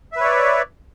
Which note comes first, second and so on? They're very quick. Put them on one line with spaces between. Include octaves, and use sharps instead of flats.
E5 B4 C#5 D5